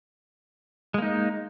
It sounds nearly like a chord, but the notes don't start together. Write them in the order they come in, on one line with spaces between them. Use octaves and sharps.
G#3 A#3 D#4